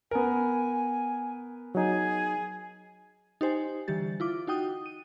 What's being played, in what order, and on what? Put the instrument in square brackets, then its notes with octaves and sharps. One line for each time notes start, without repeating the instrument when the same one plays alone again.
[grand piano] B3 A#4 [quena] G#5
[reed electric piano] F#3 D#4 [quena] G#4
[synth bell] D#4 G4 C5 G#5
D3 E3 G3 G4 A6
E4 F4 D6
D#4 F#4 G5 D#6
D#7